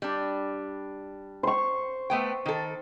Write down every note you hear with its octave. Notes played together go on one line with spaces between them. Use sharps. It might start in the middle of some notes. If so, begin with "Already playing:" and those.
G3 D4
C5 C#6
A3 B3 G5
D#3 A4